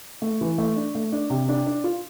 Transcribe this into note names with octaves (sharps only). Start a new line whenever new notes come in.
A3
E3
A3
D4
A3
D4
C3
D4
D4
F4